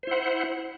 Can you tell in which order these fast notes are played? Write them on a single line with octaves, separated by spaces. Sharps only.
C5 E4 F#5